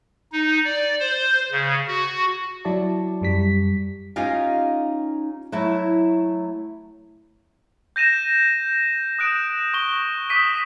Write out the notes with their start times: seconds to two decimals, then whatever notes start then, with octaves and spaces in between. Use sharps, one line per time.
0.32 D#4
0.65 D5
1.00 C5
1.52 C#3
1.87 F#4
2.65 F#3 E4 F#4 D5 A5
3.22 F#2 G3 B6
4.16 C#4 D#4 F4 G4 D#5 F5
5.52 F#3 A3 E4
7.96 G6 A#6 D#7 E7
9.19 D#6 F#6 D7 E7
9.74 C#6 G7
10.30 D6 D#6 B6 D#7